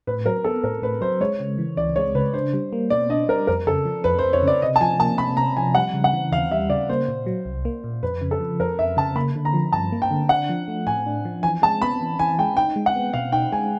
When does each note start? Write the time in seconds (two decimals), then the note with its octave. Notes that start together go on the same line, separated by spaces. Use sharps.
0.07 A2 B4
0.26 F#3 A#4
0.44 B3 A4
0.64 A2 A#4
0.82 A2 B4
1.01 F#3 C5
1.20 G#3 C#5
1.40 C#3
1.58 E3
1.77 C#2 D5
1.96 G#3 C#5
2.15 C#3 B4
2.34 D4 C5
2.54 G3
2.73 A#3
2.90 B2 D5
3.10 D4 D#5
3.28 G3 A#4
3.47 F2 A#4
3.67 C#3 A4
3.85 F3
4.04 F2 B4
4.19 C5
4.24 F2
4.33 C#5
4.42 C#3
4.47 D5
4.62 C3 D#5
4.76 A5
4.81 F3 G#5
5.00 A#3 A5
5.18 C3 B5
5.37 C3 A#5
5.57 F3 G#5
5.75 G3 F#5
5.94 C#3
6.04 F#5
6.13 E3
6.31 D#2 F5
6.51 G3 E5
6.70 C#3 D5
6.89 A#3 C5
7.08 A#2
7.26 F#3
7.46 C2
7.65 A#3
7.84 A#2
8.03 F2 B4
8.21 C#3
8.31 A4
8.40 F3
8.60 F2 A#4
8.79 F2 E5
8.97 C#3 A5
9.16 A#3 B5
9.36 D3
9.45 A#5
9.53 F3
9.72 G2 A5
9.92 A#3
10.02 G5
10.11 D3
10.29 D4 F#5
10.49 F3
10.68 A3
10.87 A2 G#5
11.06 D4
11.25 F3
11.43 E3 G#5
11.62 G#3 A5
11.82 B3 B5
12.01 E3
12.19 E3 G#5
12.39 G#3 G5
12.57 D#4 G5
12.76 G#3
12.86 F#5
12.96 B3
13.13 B2 F5
13.32 D#4 G5
13.52 G#3 G#5